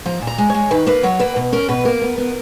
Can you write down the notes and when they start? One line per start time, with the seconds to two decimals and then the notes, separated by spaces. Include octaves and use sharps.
0.06 F3 A#5
0.22 A#2
0.27 A#5
0.38 G#3
0.50 G#3 C#5
0.71 D#3 B4
0.87 A#3 B4
1.03 F#3 C#5
1.19 A#3 B4
1.36 B2
1.52 C#4 A#4
1.68 B2 B4
1.85 A#3 A#4
2.02 B3
2.18 B3